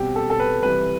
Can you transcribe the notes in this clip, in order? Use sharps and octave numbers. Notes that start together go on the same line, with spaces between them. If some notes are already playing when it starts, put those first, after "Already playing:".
Already playing: B2 G3 C4 G4
A4
A4
B4
C3 E3 G3 B4